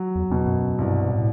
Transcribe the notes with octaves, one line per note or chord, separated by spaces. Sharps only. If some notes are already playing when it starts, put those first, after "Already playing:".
Already playing: F#3
E2
E2 B2
F#2
C2 G2
A2